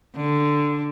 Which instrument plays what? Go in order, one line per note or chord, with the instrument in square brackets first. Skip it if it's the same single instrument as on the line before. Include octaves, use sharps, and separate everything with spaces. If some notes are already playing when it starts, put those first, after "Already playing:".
[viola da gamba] D3